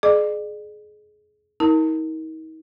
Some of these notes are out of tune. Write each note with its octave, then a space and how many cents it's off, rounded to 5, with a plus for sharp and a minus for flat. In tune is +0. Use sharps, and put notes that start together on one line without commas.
G#4 +25 D5 +40 D6 +0
D#4 +40 A#4 +0 A5 +40